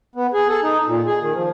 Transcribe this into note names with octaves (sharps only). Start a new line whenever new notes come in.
B3
G#4
A4
D#4
A#2
G#4
D#3
F3